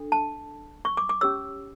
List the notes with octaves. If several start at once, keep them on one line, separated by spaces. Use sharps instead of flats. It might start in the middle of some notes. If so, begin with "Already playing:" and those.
Already playing: D4 A4
A5
C#6
D6
D6
C#4 G4 C#5 E6